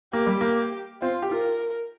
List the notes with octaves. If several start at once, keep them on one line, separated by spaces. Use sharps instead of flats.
A#3 G4
G3
A#3
C4 F4
G4
F4 A#4